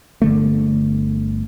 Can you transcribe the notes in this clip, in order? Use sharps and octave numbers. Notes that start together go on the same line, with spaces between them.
G1 D3 A3